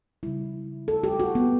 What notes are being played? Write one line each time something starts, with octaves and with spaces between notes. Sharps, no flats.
C#3 G3 E4
A4
G4
F#4
B3